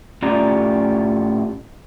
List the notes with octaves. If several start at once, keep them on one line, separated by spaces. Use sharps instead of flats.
A2 C#4 F4 G4 D5 A#5